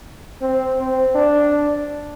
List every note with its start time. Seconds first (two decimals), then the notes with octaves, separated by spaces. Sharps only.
0.41 C4
0.79 C4
1.15 D4